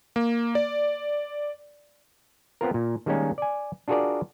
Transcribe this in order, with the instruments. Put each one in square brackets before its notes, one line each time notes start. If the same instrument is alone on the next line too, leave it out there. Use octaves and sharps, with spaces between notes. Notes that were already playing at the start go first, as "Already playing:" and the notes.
[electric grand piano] A#3
D5
[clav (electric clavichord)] B3 C4 F4 A#4
A#2
D#3 G3 G#3 A#3 C#4 D#4
D5 G#5
D4 F4 F#4 G#4 A#4 D5